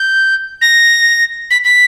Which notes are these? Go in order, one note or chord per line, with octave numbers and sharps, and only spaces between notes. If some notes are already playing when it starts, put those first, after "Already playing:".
Already playing: G6
A#6
B6
B6